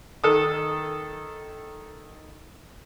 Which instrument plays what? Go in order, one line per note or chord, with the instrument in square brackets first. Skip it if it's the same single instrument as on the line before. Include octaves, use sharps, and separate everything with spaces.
[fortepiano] D#3 A4 D#6